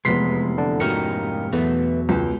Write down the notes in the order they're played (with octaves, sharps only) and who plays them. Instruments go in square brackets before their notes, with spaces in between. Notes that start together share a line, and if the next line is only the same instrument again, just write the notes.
[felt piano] F1 B3 C7 [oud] E2 C3 [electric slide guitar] G#3 [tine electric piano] C6 B6
[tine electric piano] D3 D4
[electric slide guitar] G#2 C#4 G4 [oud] A#3 D#4 F#4 [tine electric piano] F6 C#7
[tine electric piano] E2 [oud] E3 A3 [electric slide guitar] F#3 B3 F#4
[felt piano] C#2 [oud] G4 C5